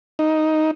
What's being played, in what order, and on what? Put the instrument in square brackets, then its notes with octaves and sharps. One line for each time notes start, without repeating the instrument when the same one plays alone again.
[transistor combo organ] D#4